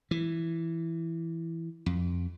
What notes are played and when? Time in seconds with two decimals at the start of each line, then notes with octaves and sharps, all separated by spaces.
0.11 E3
1.86 F2